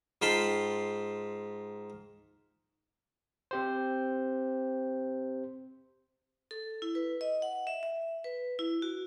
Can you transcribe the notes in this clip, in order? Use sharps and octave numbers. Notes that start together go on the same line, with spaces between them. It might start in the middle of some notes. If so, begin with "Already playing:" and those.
G#2 F4 G5 A5 B5 C6
C4 G4 C5
A4
E4
B4
D#5
F#5
E5
E5
B4
E4
F#4